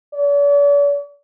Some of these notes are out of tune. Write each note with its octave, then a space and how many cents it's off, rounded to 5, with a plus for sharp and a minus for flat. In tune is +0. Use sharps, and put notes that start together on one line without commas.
D5 -45